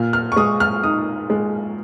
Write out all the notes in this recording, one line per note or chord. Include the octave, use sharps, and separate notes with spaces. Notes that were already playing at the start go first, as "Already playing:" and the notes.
Already playing: A#2 F6
F6
C#6
G#3 D#6
F6
D#4 D#6
G#3